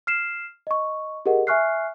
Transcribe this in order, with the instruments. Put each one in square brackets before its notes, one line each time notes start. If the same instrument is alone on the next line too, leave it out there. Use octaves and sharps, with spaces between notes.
[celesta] F6 C7 E7
D#5 C#6
G4 G#4 A#4 D#5 F#5
E5 G#5 C#6 F6 F#6 C7